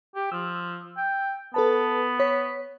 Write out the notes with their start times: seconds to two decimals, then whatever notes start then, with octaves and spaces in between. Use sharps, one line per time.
0.15 G4
0.32 F3 E6
0.97 G5
1.54 B3 A4 B4 A5
2.20 C#5 B6